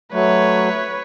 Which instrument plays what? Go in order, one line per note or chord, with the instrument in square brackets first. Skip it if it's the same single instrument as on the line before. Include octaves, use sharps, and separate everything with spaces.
[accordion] F#3 A3 [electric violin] B4 C#5